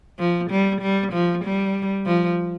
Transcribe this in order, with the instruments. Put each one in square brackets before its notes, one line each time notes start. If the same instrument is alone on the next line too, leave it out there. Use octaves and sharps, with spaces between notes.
[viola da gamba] F3
G3
G3
F3
G3
F3